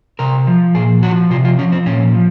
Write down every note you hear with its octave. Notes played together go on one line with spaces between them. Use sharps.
C3 A#4
F3
A#2 G#4
F3 F#4
C3 F4
F4
F3 C#4
C4
A#2 C#4
F3